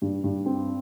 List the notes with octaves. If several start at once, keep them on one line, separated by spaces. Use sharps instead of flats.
G2
G2
C4